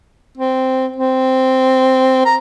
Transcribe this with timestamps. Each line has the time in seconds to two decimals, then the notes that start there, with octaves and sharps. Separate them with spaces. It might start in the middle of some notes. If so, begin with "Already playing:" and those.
0.37 C4
0.96 C4
2.25 A#5